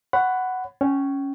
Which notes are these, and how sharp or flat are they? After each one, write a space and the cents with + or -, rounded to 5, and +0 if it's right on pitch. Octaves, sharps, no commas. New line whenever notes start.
C#5 +0 F#5 +5 B5 +20
C#4 +0 C#5 +0 G5 -30